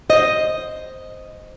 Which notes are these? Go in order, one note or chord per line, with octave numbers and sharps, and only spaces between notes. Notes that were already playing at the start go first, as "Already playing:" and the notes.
C5 D#5